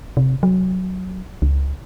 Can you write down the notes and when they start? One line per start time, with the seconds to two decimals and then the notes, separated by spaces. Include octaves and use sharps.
0.17 C3
0.43 F#3
1.42 C#2